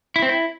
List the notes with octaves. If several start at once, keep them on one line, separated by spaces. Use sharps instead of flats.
E4
C4
E4